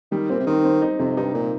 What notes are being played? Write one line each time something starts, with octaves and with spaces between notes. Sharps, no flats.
D#3 G3
A#2 C4
C3
D#3 C4
C4
D#4
F2 C3
G2 D#4
A#2 D#4